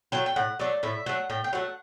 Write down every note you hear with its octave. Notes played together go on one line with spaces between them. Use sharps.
F#3 A3 G5
G5
A2 F#5
F#3 A3 D5
A2 E5
F#3 A3 F#5
A2 G5
G5
F#3 A3 F#5